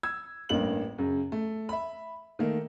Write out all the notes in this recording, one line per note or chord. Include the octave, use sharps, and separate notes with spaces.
E6 G#6
A1 G2 A#3 F#7
F#2 C#3
A3
E5 B5
D#3 A3 A#3